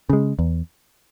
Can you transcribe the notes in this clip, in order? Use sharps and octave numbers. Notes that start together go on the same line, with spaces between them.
C#3 G#3
E2